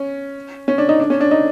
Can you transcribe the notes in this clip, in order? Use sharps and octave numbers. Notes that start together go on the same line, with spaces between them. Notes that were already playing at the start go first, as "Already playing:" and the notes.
Already playing: C#4
C#4
D4
D#4
D4
C#4
D4
D#4